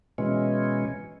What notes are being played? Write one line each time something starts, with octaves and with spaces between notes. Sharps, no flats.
B2 E3 G#3 C#4